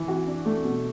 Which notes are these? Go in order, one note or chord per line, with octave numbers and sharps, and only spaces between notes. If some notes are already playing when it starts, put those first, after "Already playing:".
Already playing: E3
F#4
D4
A3
B2